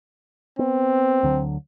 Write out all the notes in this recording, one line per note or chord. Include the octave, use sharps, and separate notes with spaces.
B3 C4
D2 D3 F#3